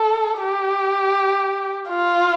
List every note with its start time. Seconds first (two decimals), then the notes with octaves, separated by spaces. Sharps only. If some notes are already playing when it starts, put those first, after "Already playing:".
Already playing: A4
0.39 G4
1.89 F4